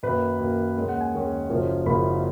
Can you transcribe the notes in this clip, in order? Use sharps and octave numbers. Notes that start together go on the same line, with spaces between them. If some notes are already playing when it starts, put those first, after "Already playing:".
F#2 D#3 A#3 B4
F#2 D#3 A#3
D#2 D#3 G#3 C#4
F#5
G#5
D#2 D#3 G#3 C#4
F#1 F#2 F3 G#3 C#4
F#1 F#2 F3 G#3 C#4 B5